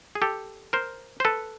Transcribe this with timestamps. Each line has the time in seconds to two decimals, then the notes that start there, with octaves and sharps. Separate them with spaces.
0.15 G#4
0.22 G4 A4
0.73 A#4 C5
1.20 C5
1.25 A4 B4